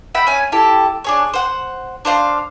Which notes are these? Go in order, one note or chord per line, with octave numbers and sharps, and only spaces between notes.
E5 F#5 G5 B5
C#4 G#5
E4 G4 A4
D4 G#4 C#5
C5 F#5
D4 C5 F5 C6